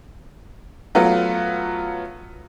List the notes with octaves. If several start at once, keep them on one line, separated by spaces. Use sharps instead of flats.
F#3 A3 B3 F4